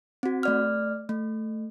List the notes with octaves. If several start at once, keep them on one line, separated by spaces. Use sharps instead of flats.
C4 F#4
A3 D5 F6
A3